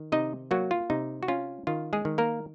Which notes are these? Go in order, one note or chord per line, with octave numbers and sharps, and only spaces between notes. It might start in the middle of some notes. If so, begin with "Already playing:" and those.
Already playing: D#3
C3 D#4 D#5
F#3 A#3 F#4
F4
C3 D#4
F#4
C#4 F4
D#3 F4
G#3 G#4
D#3
A#3 A#4